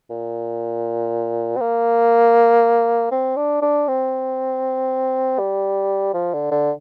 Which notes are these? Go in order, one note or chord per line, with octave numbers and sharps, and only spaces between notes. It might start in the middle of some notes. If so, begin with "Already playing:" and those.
A#2
C4
A#3
C4
D4
D4
C4
G3
F3
D3
D3